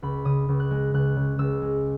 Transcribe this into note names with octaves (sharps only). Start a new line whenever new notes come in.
C#2 B5
C#3 D#6
C#2
F#6
G#3
C#2 F#6
C#3
C#2 E6
G#3